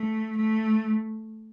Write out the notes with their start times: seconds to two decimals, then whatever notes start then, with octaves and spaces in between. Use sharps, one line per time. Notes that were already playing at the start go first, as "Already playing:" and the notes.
Already playing: A3
0.37 A3